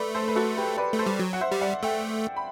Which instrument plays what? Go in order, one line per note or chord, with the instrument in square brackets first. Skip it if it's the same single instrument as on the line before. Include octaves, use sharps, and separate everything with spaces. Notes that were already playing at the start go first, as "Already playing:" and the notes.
Already playing: [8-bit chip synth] A3 [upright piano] B4 D5
[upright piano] A4 C5
B4
F#4 A4
G4 B4
B4 D5
[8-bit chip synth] A3
[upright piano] A4 C5
[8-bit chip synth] G3
F#3
[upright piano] F#5
C5 E5
[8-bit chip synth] G3
[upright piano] D5 F#5
[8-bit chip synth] A3 [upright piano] E5 G5
[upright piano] B5